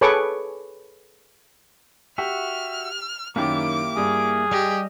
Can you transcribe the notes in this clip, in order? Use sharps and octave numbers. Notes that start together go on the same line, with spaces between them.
G#4 A4 B4 C#5 C#6 D6
F#4 G4 E5 F6
F#2 D#3 A#3 E4 G4 D6
G2 G#4
G3 G4 D#5